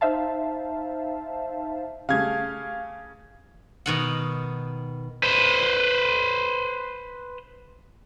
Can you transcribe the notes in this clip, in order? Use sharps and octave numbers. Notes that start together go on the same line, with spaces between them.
D#4 C5 E5 F5 A5
C#3 G3 A3 F5 G#6
B2 D#3 F#5
B4 C5